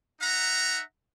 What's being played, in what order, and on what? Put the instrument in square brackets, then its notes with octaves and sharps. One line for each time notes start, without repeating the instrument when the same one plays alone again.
[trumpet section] D#4 E5 F#5 A#5